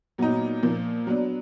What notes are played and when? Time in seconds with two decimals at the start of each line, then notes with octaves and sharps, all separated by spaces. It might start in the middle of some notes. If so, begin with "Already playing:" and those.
0.18 A#2 F#3 B3 D#4
0.63 A#2 F3 A#3
1.07 F#3 B3 D4